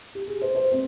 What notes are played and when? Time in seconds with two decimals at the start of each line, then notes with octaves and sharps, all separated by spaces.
0.15 G4
0.28 G#4
0.42 C5
0.55 C5
0.72 C4